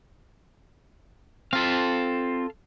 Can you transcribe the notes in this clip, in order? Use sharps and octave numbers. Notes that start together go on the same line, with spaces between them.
C4 F4 A4 F5